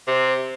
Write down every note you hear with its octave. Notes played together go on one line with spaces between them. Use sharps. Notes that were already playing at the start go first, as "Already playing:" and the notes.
C3